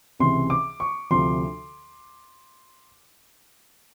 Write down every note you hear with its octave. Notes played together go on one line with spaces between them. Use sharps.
C#2 C3 E3 C6
D6
C#6
D2 C3 F3 C6